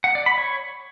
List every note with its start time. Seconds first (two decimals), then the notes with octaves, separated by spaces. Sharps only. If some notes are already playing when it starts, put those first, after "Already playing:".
0.04 F#5
0.15 D5
0.26 B5
0.37 C#5